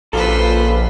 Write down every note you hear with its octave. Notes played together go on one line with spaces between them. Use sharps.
A#1 C#3 F4 A4 B4 C5